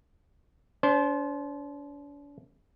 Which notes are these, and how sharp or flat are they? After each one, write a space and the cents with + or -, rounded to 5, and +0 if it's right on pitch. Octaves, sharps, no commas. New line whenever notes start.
D4 -45 C5 +0